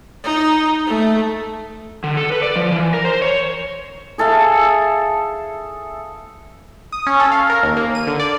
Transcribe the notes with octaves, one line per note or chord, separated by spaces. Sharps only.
D#4
A3
D3
A4
B4
D5
F3
E3
A#4
C5
C#5
G#4 A4 E5 F5
D#6
C#4
A4
F5
A#4
D#2
A#3
D#7
D3
D5